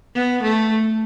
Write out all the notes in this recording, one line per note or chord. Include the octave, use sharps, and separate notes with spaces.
B3
A3